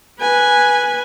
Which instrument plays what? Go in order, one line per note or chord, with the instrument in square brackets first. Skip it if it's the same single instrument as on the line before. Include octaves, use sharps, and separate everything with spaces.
[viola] B4 G#5